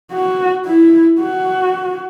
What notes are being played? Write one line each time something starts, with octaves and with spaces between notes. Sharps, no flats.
F#4
E4
F#4